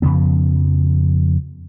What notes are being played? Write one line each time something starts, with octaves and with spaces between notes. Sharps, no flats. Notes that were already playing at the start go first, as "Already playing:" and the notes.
F2 C#3 F3 B3